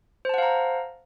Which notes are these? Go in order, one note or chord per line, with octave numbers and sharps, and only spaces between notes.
C5 F5 F#5 A5 A#5